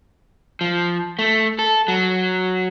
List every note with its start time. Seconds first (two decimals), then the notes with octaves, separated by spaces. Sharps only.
0.61 F3
1.19 A3
1.59 A4
1.88 F#3